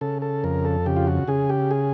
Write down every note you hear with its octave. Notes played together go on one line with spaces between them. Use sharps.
C#3 A4
A4
F2 A#4
A4
C#3 G4
F4
F#4
C#3 G#4
G4
G#4